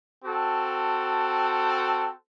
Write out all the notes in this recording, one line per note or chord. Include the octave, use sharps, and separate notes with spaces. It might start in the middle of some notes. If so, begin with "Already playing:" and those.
C4 F#4 A4 A5